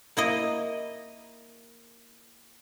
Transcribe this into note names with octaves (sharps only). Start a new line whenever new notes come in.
A#3 E4 D#5